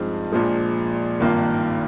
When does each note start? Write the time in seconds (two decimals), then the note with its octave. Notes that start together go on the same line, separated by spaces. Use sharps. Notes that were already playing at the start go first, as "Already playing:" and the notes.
Already playing: G2 F3 G#3 C4 D#4
0.32 A#1 A#2 F3 G#3
1.20 G#1 G2 D#3 A#3 F4